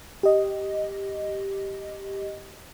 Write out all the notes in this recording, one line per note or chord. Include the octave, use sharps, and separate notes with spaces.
G4 D#5